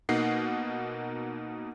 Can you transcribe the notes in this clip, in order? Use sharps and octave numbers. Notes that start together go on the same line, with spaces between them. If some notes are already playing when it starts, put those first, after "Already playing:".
B2 A#3 D#4 F#5 C7